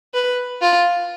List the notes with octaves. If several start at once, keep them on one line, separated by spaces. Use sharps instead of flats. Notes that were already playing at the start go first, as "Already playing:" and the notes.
B4
F4